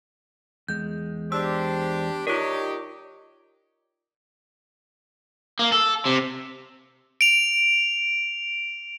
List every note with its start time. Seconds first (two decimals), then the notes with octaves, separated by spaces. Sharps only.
0.68 E2 G#3 G6
1.32 D4 G4 C5 E6
2.27 D#4 F4 G4 A#4 C#5 D5
5.59 A#3
5.72 A4
6.06 C3
7.21 D7 F7